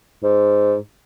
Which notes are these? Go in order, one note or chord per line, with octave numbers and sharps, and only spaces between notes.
G#2